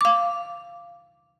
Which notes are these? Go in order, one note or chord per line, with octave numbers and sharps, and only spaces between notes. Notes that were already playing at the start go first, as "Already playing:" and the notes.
F5 D6